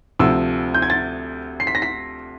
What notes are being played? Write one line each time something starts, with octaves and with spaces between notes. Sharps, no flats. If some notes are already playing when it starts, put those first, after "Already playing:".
D2 C3 F3 E6
G6
G#6
A6
C7
B6
A#6
B6